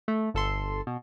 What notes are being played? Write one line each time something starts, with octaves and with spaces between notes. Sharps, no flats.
A3
G1 A4 C6
B2